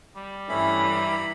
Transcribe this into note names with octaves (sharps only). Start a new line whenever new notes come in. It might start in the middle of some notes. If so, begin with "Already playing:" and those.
G3
G2 E3 A3 C#4 E4 B5
E4 A#5